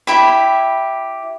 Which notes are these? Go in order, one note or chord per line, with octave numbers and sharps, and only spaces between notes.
E4 G4 E5 B5